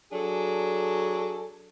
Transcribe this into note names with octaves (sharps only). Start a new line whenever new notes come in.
F#3 D4 G#4 A4